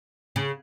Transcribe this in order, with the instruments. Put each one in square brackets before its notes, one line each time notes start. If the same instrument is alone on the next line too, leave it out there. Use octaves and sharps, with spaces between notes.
[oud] C#3